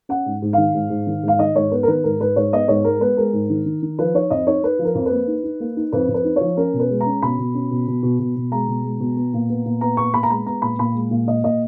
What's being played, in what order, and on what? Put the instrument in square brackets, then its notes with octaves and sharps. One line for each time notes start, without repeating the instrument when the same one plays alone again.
[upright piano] C#4 F#5
G#2
G#2
D#3 F5
G#2
G#2
D#3
G#2 F5
D#3 D#5
G#2 C#5
B3 B4
A#4
D#3 B4
G#2 A#4
G#2 B4
G#2 C#5
B3 D#5
G#2 C#5
G#3 A#4
B3 B4
G#3 A#4
G#2
D#3
D#3
D#3
F3 B4
D#4 C#5
F2 D#5
D#4 C#5
D#4 B4
F3
A#4
F2
B4
A#3
D#4
D#4
A#3
D#4
F2 B4
F2
B4
D#4
F3 C#5
C#4 A#4
B2
B4
G#3
A#5
C#4
B2 B5
B2
C#4
B2
B2
B2
B2
B2
G#3 A#5
B2
G#3
B2
B3
A#2
B3
A#2
B3 A#5
A#2 C#6
B3 B5
A#5
G#3 B5
B3 A#5
A#2 B5
A#2 B5
G#3
A#2
A#2 D#5
A#2 D#5